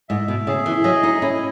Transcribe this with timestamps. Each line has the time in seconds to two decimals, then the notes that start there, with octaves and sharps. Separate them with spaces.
0.09 G#2 E5
0.28 B2
0.47 C#3 G#4
0.66 E3
0.84 F#3 D#5
1.03 D#4
1.22 C#4 E4